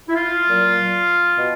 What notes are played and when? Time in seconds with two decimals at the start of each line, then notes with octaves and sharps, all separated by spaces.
0.09 E4
0.14 F4
0.46 A#2 F#3
1.37 B2